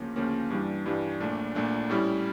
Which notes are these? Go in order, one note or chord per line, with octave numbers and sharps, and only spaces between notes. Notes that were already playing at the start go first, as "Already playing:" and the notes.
Already playing: D2 C#3 F3 A#3 C#4
D2 C#3 F3 A#3 C#4
G2 E3 G3 D4
G2 E3 G3 D4
A#1 A#2 A3 D4
A#1 A#2 A3 D4
A2 G3 C#4 E4